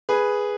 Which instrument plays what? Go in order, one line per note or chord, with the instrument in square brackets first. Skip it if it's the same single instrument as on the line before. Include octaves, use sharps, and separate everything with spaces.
[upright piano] G#4 B4